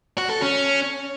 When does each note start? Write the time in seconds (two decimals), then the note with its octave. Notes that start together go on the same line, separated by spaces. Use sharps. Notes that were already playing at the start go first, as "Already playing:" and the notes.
0.18 F#4
0.30 A4
0.41 C#4